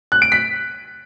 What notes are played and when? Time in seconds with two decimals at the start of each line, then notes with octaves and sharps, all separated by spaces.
0.12 F#6
0.22 D7
0.32 B6